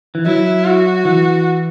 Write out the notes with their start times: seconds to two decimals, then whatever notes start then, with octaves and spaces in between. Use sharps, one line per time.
0.15 E3
0.26 F#3 E4
0.66 F#4
1.05 E3